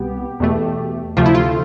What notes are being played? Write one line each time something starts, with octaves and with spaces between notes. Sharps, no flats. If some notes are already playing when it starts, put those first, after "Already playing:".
Already playing: C2 B2 B3 G4
E2 B2 A3
D2 C3 F3 A3 F4
E4
F4